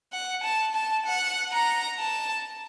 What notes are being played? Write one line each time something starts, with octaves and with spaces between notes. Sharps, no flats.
F#5
A5
A5
F#5
A#5
A5